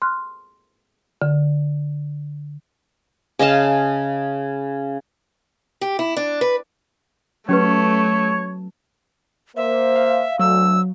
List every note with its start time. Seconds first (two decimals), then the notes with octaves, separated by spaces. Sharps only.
0.02 C6 F6 F#6
1.22 D3
3.39 C#3 D#5 F5 A5
5.81 G4
5.99 E4
6.17 D4
6.41 B4
7.49 F#3 A3 C#4 G4 B4 C#5
9.57 A#3 C5 E5
9.96 F5
10.39 D2 F#3 E6